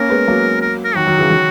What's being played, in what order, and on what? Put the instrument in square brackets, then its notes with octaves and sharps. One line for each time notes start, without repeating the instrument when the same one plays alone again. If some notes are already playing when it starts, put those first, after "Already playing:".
Already playing: [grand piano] A#3 C#4 [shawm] A#4
[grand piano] G#3 B3
F#3 A#3
[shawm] A#4
A#4
[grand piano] D#3 F#3 [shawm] F#4
[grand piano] D#3 F#3
C#3 E3
D#3 F#3